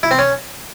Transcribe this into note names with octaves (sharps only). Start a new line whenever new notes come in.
E4
C4
C#4